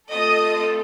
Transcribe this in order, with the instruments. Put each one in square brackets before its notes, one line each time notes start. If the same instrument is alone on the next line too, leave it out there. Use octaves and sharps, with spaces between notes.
[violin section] A3 C4 F4 A4 D#5 D#6